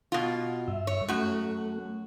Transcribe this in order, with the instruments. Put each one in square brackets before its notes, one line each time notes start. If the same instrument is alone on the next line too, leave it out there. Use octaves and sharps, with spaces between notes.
[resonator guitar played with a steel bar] B2 F4
[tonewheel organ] G2 E5
[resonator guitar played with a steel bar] C#5
[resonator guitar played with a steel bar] F#2 F#4 [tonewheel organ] A3